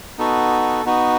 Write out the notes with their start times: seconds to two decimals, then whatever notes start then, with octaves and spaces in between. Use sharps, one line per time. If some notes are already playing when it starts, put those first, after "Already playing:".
0.18 B3 D#4 F#4 A4
0.85 B3 D#4 F#4